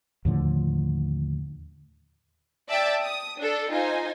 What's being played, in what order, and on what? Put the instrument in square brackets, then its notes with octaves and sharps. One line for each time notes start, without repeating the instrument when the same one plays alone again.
[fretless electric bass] D#2 A2 D3 F3
[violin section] D5 E5 G5 A5 D6 E6
D#6
D4 A4
D#4 F4 C5 G#5